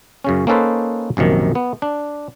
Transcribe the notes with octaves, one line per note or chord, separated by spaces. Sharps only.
F#2 C#3 C#4
A#3 C#4 D#4 A4 B4 C5
A#1 F#2 C3 D#3
B3
D4